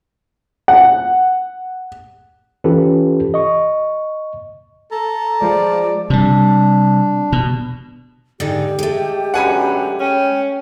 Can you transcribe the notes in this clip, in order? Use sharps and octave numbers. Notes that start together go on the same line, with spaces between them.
F#5
E3 C#4 F4 G4 A4 B4
D#5 C#6
A4 A5 A#5
F3 G#3 D5
C3 G3 D4
B2
G#2 D3 D#4 G4
G#3 A3
F#2 B2 D3 F#5 G#5 B5
C#4 G5